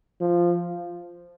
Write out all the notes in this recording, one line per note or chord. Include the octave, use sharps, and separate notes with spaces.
F3